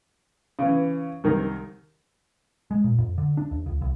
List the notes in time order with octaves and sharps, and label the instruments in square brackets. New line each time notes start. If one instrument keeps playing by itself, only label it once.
[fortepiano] C#3 E3
C2 D#3 A#4
[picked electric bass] G#3
A#2
F2
D3
D4
D#2
C#2
C2